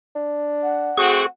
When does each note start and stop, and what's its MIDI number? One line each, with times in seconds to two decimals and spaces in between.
0.16 0.94 62
0.63 1.28 78
0.98 1.23 57
0.98 1.23 60
0.98 1.23 66
0.98 1.26 68
0.98 1.26 85